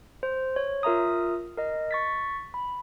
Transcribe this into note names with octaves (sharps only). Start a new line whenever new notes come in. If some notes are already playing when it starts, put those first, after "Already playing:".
C5
C#5
F4 A#4 E5 A#5 D#6
A#4 D#5
C#6 A6 B6
B5